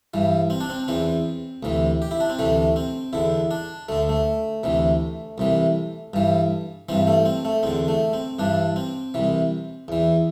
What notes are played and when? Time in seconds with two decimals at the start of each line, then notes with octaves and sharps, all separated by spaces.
0.14 G2 E3
0.50 C4
0.61 D4
0.70 C4
0.88 E2 E3 C4
1.63 D2 C3 E3
2.02 G4
2.11 E4
2.20 D4
2.30 C4
2.39 D2 C3 E3 A3
2.76 C4
3.13 E2 D3 E4
3.51 D4
3.89 D2 D3 A3
4.09 A3
4.64 D2 C3 E3
5.38 C2 C3 E3
6.14 G2 E3
6.89 G2 E3 C4
7.07 A3
7.25 C4
7.45 A3
7.63 E2 D3 C4
7.88 A3
8.13 C4
8.39 G2 E3 D4
8.76 C4
9.14 C2 C3 E3
9.88 E2 E3